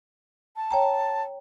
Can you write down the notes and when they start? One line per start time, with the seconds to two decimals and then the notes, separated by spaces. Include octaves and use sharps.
0.56 A5
0.71 C#5 G5 A#5